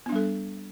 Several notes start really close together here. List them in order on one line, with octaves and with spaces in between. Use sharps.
B3 D4 G3 A4